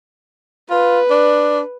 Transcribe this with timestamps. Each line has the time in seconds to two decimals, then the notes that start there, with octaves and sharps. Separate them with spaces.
0.70 F4 B4
1.11 D4